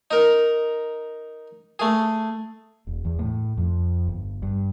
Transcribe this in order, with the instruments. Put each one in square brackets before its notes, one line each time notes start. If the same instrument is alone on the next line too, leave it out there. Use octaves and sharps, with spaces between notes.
[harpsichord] D#4 A#4
A3 G#4
[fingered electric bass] E1
E2
A2
F2
G1
G2